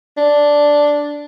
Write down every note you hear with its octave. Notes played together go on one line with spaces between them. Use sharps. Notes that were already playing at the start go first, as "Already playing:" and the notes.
D4